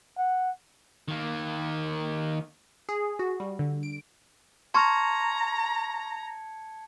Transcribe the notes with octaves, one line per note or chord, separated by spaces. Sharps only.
F#5
D#3 A#3
G#4
F#4
G3
D3
D7
A5 A#5 C6 C#6 F6 G#6 C#7